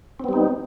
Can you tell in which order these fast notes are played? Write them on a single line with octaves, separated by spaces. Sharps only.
C4 B3 G3 D#4